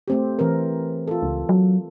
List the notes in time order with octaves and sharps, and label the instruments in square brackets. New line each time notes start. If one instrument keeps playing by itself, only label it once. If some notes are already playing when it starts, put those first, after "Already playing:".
[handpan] A3 C4 G4
E3 C4 A#4
F4 A4
[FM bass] C#2
F#3